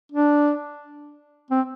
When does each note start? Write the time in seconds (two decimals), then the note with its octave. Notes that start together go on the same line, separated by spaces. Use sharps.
0.12 D4
1.51 C4